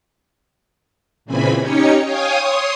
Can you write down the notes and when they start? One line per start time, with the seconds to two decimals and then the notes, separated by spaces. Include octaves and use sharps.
1.25 A#2 C#3 E3 C4 G#5 B5
1.57 C#4 D#4 G4 C#5 C#7
2.02 C#5 F5 G5 G#5 D#6
2.35 C#5 C6 D#6